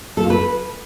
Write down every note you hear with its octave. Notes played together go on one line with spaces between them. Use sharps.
A4
F4
B4